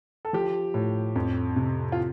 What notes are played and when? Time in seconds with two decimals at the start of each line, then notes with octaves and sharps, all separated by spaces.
0.25 A4
0.33 F3 G4
0.74 A2
1.16 F2
1.56 C3
1.92 F4